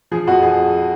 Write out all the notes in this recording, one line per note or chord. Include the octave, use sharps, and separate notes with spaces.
F3 G#4
F2 F#4
F3 G#4